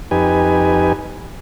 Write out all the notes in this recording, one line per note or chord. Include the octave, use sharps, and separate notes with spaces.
F2 D#4 G4 B4 G#5